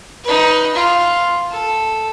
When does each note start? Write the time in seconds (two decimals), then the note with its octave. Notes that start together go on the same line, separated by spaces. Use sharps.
0.24 D#4 B4
0.75 F4
1.51 A4